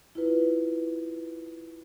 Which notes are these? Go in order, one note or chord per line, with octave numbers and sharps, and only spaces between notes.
E4 F4 B4